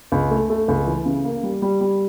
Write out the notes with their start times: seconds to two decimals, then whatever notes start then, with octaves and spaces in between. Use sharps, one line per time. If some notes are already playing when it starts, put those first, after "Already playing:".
0.12 C#2
0.31 A3
0.50 A3
0.68 C#2
0.87 E3
1.06 C#3
1.25 A#3
1.43 G3
1.62 G3
1.81 G3